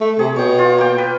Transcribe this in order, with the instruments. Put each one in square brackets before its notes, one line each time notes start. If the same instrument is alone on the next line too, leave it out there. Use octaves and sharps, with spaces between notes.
[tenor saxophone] A3
[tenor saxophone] C3 [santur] G#4
[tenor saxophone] B2 [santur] C#5 G5
[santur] F4
A#3 G5
B4